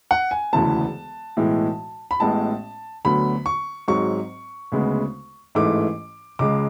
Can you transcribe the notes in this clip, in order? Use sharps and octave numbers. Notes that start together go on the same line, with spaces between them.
F#5
G#5
E1 D2 C#3 E3 B3 A5
B1 A2 E3 G#3
B5
A1 A2 G#3 B3 A5
D2 D3 F#3 B3 B5
C#6
G#1 G#2 F#3 C#6
D2 C#3 G#3 B3
A1 G#2 E3 A3 D6
C#2 C#3 G#3 D6